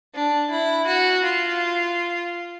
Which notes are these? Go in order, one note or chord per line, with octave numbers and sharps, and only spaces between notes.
D4
E4
F#4
F4